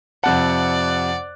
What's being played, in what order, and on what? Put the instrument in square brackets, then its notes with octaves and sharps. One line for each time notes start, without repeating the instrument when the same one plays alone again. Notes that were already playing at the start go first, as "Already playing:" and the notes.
[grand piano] F2 C3 A5 [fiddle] D5 [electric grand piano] F#5 F#6